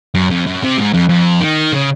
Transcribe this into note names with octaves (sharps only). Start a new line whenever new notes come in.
F#2
F2
F#2
C3
G#2
F2
F2
D#3
C#3